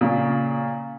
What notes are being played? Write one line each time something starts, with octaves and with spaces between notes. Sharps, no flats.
A#2 C#3